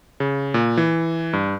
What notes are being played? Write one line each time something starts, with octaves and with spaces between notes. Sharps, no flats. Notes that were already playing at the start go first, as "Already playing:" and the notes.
C#3
A#2
E3
G2